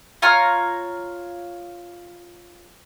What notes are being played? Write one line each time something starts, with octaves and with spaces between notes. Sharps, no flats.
F4 C#5 A#5 F6